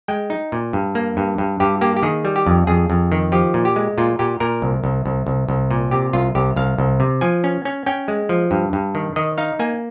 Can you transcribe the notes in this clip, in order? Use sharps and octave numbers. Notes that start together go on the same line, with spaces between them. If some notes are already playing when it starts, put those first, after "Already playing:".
G#3 G5
D#4
A#2
G2
A#3
G2
G2
G2 G4
A#3 G4
G4
D#3 G#4
G3
G4
F2
F2 G#4
F2
D#3
F3 G4
A#2
G4
G#3
A#2 F4
A#2 G4
A#2 A#4
C2
C2
C2
C2
C2
A#2
C3 G4
C2 F4
C2 G4
C2 F5
C2
C3
F3 G#5
C#4
C#4
C#4 G5
G#3
F3
G2
G2
D#3
D#3 D#5
D#4 F5
A#3 G#5